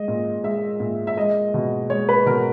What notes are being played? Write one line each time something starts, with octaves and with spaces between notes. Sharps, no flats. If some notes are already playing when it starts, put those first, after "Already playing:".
Already playing: G#3 D#5
A#2
G#3 E5
A#2
E5
G#3 D#5
B2
G#3 C#5
B4
B2 A#4